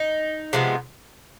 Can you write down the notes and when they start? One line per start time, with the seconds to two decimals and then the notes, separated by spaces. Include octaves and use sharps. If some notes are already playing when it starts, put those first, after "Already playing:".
Already playing: D#4
0.53 C3 F3 G#3 B3